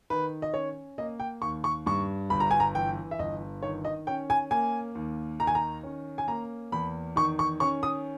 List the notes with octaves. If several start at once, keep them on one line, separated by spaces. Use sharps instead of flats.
D#3 B4
D#5
C#4 C#5
A#3 D#5
G5
D#2 C#6
C#6
G2 C#6
G1 B5
A#5
G#5
A#5
E3 G5
E5
G1 D#5
D#3 C#5
D#5
C#4 G5
G#5
A#3 G#5
D#2
D#3 A#5
G#5
A#5
C#4
G#5
A#3 A#5
E2 B5
D#3 C#6
C#6
C#4 C#6
D#6